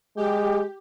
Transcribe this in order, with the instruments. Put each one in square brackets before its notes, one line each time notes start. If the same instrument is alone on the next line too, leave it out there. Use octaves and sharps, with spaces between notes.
[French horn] G#3 [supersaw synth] G4